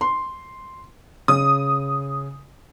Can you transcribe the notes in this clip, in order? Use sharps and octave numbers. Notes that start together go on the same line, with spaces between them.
C6
C#3 D#6